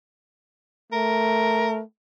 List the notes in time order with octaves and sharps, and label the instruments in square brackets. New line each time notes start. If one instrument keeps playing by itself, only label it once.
[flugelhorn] A3 [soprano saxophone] A#4